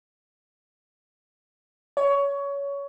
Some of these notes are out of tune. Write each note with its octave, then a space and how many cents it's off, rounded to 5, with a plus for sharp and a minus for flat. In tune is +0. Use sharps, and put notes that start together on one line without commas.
C#5 +20